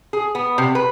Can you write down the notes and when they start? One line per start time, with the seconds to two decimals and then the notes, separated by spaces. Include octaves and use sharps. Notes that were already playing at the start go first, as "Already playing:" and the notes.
0.13 G#4
0.35 B3
0.58 C3
0.75 B4